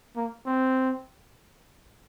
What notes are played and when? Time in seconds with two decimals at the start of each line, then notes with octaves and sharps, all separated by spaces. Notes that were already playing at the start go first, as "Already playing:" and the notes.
0.17 A#3
0.46 C4